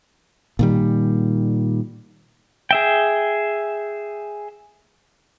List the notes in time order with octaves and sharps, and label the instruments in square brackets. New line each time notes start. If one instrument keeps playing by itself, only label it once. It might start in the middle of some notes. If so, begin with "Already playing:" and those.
[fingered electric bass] A#2 D#3 G3
[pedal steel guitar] G#4 E5 G5